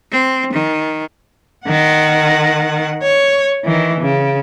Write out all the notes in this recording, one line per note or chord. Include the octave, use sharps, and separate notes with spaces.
C4
D#3
D#3 F#5
C#5
D#3 E3
C#3